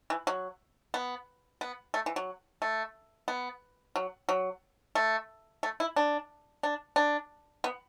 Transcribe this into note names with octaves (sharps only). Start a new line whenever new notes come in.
E3
F#3
B3
B3
A3
E3
F#3
A3
B3
F#3
F#3
A3
A3
E4
D4
D4
D4
B3